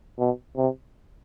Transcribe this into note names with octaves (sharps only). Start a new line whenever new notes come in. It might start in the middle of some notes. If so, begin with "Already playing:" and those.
B2
C3